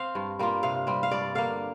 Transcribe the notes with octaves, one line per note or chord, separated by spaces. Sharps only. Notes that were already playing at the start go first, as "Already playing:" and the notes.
Already playing: C4 F5
G2
G3 A#3 F4
C3 F5
G3 C4
F5
G2 D5
D3 A#3 F5